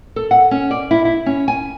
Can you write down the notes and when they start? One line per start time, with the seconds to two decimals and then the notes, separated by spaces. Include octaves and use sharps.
0.16 A4
0.31 F#5
0.51 C#4
0.71 D5
0.91 E4
1.05 E4
1.26 C#4
1.48 G#5